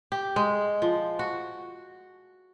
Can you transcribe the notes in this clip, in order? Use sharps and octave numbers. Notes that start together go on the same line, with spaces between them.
G4
G#3
F3
F#4